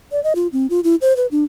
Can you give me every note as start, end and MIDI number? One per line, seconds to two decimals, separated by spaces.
0.12 0.22 74
0.24 0.33 75
0.35 0.47 65
0.53 0.67 60
0.70 0.80 65
0.84 0.95 64
1.01 1.16 72
1.17 1.27 71
1.31 1.44 62